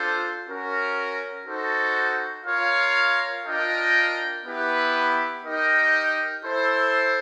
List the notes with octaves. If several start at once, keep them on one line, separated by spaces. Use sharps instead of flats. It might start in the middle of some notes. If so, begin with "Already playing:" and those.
Already playing: D4 F4 A4 C5
C#4 F#4 A#4
D#4 F#4 A4 C5
F4 A#4 C#5 F5
D4 F4 A#4 D#5 G5
B3 E4 G4 B4
D#4 G4 A#4 D#5 G5
E4 A4 C5